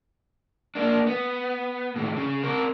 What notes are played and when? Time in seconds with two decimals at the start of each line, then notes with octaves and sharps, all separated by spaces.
0.75 A#3 D4
1.07 B3
1.96 A2 D#3
2.16 C#3
2.43 C4 A#4